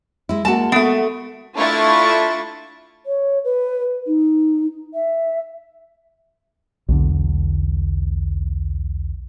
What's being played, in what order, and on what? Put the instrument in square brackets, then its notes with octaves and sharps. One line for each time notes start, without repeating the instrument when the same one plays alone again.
[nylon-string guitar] G#3 E4
[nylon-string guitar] G#3 A#3 F#4 [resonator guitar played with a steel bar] A5
[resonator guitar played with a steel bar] A3 B3
[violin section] A3 D4 E4 F4 C#6 A6
[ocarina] C#5
B4
D#4
E5
[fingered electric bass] B1 E2 D3